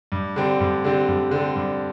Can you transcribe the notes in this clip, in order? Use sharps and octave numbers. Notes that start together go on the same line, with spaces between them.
G2
D3 G3 C4
G2
D3 G3 C4
G2
D3 G3 C4
G2